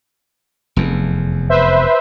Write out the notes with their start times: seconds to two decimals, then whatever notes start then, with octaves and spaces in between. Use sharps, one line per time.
0.76 F1 E2
1.49 B4 C5 E5